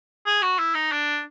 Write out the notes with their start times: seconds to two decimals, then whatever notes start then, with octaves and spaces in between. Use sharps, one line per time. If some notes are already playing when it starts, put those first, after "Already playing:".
0.26 G#4
0.42 F#4
0.59 E4
0.74 D#4
0.92 D4